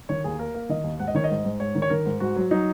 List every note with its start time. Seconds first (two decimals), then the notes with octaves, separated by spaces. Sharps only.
0.09 D#3 C#5
0.24 D#2 G#4
0.39 A#3 A#4
0.55 A#3
0.69 D#3 D#5
0.84 D#2
0.99 G#2 F#5
1.08 D#5
1.15 D#3 C#5
1.24 D#5
1.31 G#2
1.45 G#2
1.60 G#2 C#5
1.75 D#3
1.82 C#5
1.90 D#3 A#4
2.06 G#2
2.20 G#2 F#4
2.36 F#3
2.51 F#3 D#4